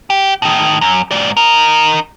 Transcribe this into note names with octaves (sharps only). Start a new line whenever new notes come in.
G4
A2 D#3
F#2
G#2 D5
D#4 A#4